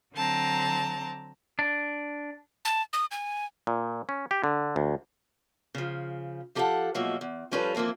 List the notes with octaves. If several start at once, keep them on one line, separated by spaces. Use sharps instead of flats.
D3 F#3 C4 A5 A#5
D4
A5
D#6
G#5
A#2
C#4
G4
D3
D2
C#3 F3
F3 G4 A4 D#5 F5 F#5
B2 F3 F#3 G#3 A#3 E5
E2
F3 G3 C#4 F4 A4 B4
E3 F3 A#3 C4 E4